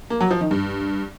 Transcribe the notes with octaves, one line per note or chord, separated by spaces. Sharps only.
A#3
F#3
F3
D#3
G2